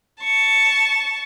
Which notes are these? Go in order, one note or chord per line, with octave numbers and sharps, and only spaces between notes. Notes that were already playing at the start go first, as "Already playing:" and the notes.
A5 C#6